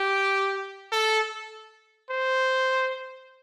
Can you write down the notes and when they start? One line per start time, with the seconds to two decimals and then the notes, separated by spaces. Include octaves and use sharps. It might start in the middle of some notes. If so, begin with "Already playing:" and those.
Already playing: G4
0.92 A4
2.10 C5